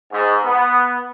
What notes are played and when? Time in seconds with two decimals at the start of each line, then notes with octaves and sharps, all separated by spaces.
0.11 G#2
0.44 B3